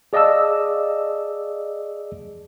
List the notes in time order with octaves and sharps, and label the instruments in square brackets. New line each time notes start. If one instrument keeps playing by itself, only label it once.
[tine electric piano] G#4 D5 D#5 F5 A5 E6